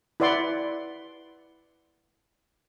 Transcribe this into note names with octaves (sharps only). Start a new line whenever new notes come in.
E4 B4 D5 F#5 C6